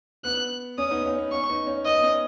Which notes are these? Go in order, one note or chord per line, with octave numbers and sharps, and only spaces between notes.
B3 F#6
C#4 D#6
B3 D#4
C#4
B3
C#4 C#6
B3 D#4
C#4
B3 D#5
C#4